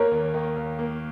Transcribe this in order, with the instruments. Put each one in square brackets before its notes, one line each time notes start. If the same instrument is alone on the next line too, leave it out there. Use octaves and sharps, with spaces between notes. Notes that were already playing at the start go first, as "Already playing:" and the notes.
Already playing: [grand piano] A#3 [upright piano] A#4 C#5
[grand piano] D#2
D#3
D#2
A#3